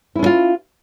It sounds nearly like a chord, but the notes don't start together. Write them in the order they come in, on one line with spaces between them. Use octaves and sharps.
E4 C#4 D4 F4